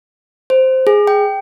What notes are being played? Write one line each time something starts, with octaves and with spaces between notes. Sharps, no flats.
C5
G#4
G5